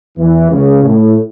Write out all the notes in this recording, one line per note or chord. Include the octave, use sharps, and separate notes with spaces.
E2 E3
C#2 C#3
A2